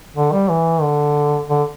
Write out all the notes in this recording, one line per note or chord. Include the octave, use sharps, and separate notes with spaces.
D3
G3
E3
D3
D3